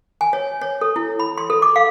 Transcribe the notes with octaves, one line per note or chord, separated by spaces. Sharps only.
G#5
C#5
C#5
A4
E4
B5
C6
A4
D6
F5